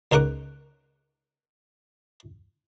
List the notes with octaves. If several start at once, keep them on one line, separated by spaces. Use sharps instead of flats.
C#2 D#4 A#4 F#5 D6